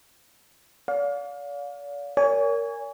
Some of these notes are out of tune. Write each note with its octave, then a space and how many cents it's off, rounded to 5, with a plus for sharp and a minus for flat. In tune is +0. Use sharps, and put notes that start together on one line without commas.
D5 -40 F5 +30
A#4 -5 C#5 +35 G#5 -15